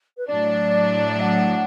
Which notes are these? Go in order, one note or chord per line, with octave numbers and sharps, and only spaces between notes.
B4
A2 F#3 D4 D5
F#5